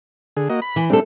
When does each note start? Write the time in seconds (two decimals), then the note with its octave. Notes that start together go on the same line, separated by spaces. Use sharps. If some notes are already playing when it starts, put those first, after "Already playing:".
0.37 D3 G#4
0.50 A#3 F#4 D#5
0.62 B5
0.76 E3
0.90 G3 A3 C4 D4 A4